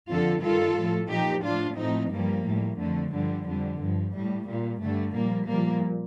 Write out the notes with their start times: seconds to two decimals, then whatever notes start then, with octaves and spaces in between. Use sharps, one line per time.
0.08 F2 D3 F3 F4 A4
0.42 G2 D#3 G3 F4 A4
0.77 A2 F3
1.10 A#2 F3 D#4 G4
1.43 A2 F3 D4 F4
1.77 A2 F3 C4 D#4
2.11 G2 F3 G3 A#3
2.45 A2 G3
2.79 F2 D3 F3 A3
3.13 G2 D3 F3 G3
3.46 F2 D3 G3
3.80 G2 F3
4.14 A2 G3
4.48 A#2 G3
4.81 G2 D3 G3 A3
5.14 A#2 F3 G3 A#3
5.48 A#2 F3 G3 A#3